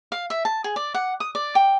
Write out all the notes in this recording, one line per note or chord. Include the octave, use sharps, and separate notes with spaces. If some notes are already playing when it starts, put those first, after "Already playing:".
F5
E5
A5
G#4
D5
F#5
D#6
D5
G5